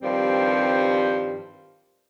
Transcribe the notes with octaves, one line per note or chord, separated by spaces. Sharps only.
G2 D#3 F3 G3 C4